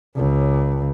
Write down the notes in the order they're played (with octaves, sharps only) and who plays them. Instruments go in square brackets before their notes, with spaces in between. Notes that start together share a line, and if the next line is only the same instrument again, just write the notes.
[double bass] C#2